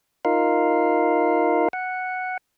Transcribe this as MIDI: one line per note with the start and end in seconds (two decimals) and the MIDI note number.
0.25 1.68 63
0.25 1.68 65
0.25 1.68 70
0.25 1.68 77
1.73 2.37 78